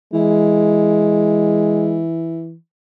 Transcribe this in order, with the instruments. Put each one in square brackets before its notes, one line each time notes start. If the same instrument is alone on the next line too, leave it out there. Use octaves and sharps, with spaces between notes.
[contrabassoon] E3 [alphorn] G#3